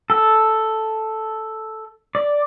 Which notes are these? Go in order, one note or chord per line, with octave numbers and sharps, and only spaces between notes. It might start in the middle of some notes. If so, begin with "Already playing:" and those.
A4
D5